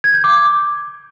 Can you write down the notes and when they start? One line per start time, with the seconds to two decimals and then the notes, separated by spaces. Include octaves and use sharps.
0.04 G#6
0.14 G6
0.24 D6